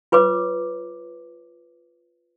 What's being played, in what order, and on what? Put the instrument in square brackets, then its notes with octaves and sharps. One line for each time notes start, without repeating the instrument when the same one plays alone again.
[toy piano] F4 B4 C#5 D6